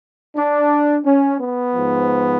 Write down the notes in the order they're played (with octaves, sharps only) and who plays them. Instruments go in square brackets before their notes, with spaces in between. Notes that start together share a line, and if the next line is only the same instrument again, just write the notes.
[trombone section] D4
C#4
B3
G#2 F3